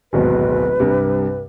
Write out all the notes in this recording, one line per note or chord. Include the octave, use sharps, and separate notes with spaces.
D1 G#1 B2 B4
C2 G2 C3